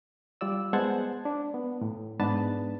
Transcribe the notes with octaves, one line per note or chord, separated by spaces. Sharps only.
G3 F4 D5 E6
G#3 B3 C5 F#5 A5 G#6
D4
B3
A2
G#2 B3 D4 B4 A5 A6